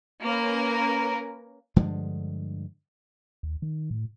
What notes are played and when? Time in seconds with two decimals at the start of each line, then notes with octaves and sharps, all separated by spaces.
0.24 A#3 C#4 A#4 B4
1.76 G2 D3 F3 G#3
3.43 D#2
3.62 D#3
3.91 A2